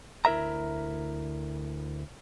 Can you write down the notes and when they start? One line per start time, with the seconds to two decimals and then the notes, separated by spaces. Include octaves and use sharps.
0.25 D2 E4 A#4 E5 A#5